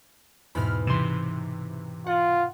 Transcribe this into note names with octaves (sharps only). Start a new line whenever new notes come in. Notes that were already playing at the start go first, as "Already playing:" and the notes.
E2 G#2 B2 B5 F6
C3 E3 C6 D#7 E7
F4 F#5